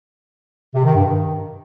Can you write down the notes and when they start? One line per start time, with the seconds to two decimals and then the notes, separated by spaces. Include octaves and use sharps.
0.75 C3
0.85 D#3
0.96 G2
1.06 D#3